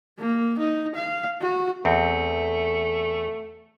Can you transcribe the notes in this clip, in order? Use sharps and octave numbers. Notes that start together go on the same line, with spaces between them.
A#3
D#4
F5
F#4
E2 A3 C4